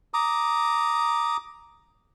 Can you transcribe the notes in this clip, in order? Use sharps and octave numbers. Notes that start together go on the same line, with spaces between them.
A#5 D6 D#6